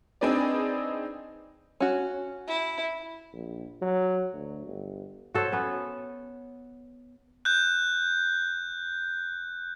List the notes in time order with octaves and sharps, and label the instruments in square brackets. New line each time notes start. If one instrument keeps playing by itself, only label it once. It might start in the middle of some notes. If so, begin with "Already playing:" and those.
[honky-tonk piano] C4 D4 D#4 G#4 B4 D5
[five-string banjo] C#4 F#4
[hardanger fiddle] E4
[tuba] A#1
F#3
D2
G1
[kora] F#4 A4 C5 C#5
B3 C#4 B4
[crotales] F#6 G6